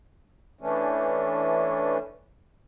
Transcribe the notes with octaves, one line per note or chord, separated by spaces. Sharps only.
E3 A3 C#4 D4